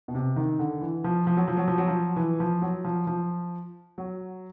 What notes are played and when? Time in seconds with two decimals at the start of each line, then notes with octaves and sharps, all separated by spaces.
0.08 B2
0.14 C3
0.36 D#3
0.59 D3
0.81 E3
1.04 F3
1.27 F3
1.37 F#3
1.48 F3
1.57 F#3
1.68 F3
1.78 F#3
1.88 F3
2.16 E3
2.40 F3
2.62 F#3
2.84 F3
3.07 F3
3.98 F#3